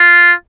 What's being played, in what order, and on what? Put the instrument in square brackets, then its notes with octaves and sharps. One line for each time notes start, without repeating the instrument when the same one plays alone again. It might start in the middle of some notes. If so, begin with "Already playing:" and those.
Already playing: [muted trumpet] F4